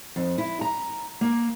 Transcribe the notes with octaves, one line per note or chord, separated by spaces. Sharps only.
F2
E4
A#5
A#3